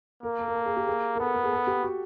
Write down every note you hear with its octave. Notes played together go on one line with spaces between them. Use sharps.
A#3 A#4
A4
A#4
A4
G#4
G4
G#4
A#4
B3 A4
A#4
G#4
A4
G4
F#4